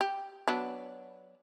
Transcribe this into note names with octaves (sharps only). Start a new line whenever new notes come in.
G4
F#3 B3 D4